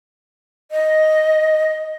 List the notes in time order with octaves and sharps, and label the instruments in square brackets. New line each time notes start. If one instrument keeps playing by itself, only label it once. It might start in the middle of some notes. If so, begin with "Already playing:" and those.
[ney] D#5